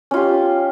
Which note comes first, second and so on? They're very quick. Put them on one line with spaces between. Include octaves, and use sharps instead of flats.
C#4 F4 G4